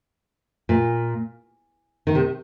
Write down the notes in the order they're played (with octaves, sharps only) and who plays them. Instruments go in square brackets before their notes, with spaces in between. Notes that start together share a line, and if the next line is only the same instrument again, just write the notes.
[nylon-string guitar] A#2
D#3
C3